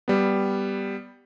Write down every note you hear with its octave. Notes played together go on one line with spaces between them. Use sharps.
G3 B3